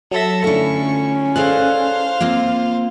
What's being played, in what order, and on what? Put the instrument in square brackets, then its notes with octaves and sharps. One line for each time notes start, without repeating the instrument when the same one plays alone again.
[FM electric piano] F#3 A#6 [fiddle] A4 E5
[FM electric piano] D3 A3 [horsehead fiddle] C#4 [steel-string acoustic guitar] E4 F4 [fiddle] C#6
[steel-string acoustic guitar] G#4 A4 D5 [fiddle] C5 F5 [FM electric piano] F#6
[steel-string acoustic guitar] A#3 C4 F4